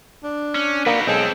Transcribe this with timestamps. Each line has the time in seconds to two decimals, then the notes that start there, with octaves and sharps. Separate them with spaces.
0.24 D4
0.55 C#4
0.86 A#3 D#4 F#4 B4 D5
1.07 B1 G#3 C4 A4